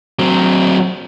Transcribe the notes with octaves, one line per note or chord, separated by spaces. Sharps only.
F#3 C4